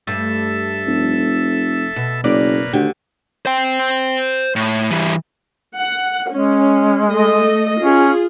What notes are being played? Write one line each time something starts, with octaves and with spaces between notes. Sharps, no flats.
G2 A3 A4 E5
F1
B2
F#1 B2 A#3 B4 D5
D2 D3 D#3 G4
C5 G5
A2
E3 G3
F#5
G#3 C#4
A3 A4 D#5
C#4 F4 G#4